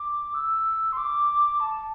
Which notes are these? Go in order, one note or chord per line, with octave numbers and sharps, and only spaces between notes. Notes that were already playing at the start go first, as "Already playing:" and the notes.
Already playing: D6
E6
C6
D6
A5